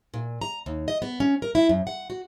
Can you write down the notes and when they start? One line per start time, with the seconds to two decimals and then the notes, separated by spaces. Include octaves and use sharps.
0.14 A#2
0.41 A#5
0.66 D#2
0.88 D#5
1.02 B3
1.20 C#4
1.42 A#4
1.55 E4
1.69 F#2
1.87 F#5
2.10 F#4